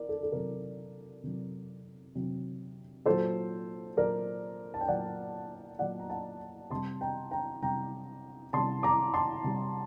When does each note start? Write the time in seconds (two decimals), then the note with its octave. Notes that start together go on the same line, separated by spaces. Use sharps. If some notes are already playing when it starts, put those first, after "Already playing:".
Already playing: A#4 D5
0.09 A4
0.23 A4
0.32 C3 F#3 A#4
1.23 C3 F#3
2.15 C3 F#3
3.06 A#2 F#3 A4 C5
3.97 A#2 F#3 A#4 D5
4.74 A5
4.81 G5
4.88 A#2 F#3 D5 F#5
5.79 A#2 F#3 D5 F#5
5.99 A#5
6.10 F#5 A5
6.71 C3 G3 A5 C6
7.01 G5 A#5
7.31 G5 A#5
7.62 C3 G3 G5 A#5
8.53 C3 G3 A5 C6
8.83 A#5 D6
9.14 A5 C6
9.44 C3 G3